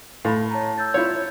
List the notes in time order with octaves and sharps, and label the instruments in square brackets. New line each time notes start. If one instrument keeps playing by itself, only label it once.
[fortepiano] A2 [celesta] F5 B5
[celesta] C#5 A5 A#5
E6 G6 A6
[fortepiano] E4 F4 C#5